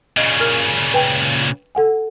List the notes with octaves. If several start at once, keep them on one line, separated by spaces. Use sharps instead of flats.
A#2 C#3 D#5
A#4 F6
B4 G5 G#5
A4 F#5 G#5